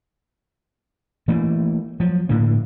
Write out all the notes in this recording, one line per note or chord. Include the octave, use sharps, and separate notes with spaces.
E3 A3 A#3
F3 F#3
A2 D3 A#3